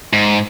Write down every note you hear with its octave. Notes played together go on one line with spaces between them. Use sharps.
G#2